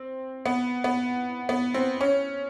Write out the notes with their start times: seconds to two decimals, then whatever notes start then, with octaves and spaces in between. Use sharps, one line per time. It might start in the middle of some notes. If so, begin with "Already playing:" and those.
Already playing: C4
0.46 B3
0.84 B3
1.49 B3
1.74 C4
2.01 C#4